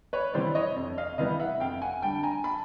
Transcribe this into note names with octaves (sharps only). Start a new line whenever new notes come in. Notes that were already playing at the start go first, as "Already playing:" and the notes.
B4 C#5
C3 E3 G3 B3 C5 D5
C#5 D#5
F2
D#5 F5
C3 E3 G3 B3 D#5 F5
E5 F#5
F2 F5 G5
F#5 G#5
D3 G3 G5 A5
G#5 A#5
A5 B5